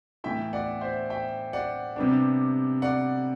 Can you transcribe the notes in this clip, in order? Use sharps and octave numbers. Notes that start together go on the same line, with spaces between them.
A2 E3 B3 E4 E5 G5
D5 F#5
C5 E5
E5 G5
D5 F#5
C3 G3 B3 D4
D5 F#5